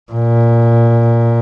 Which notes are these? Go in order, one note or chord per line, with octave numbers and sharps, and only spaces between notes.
A#2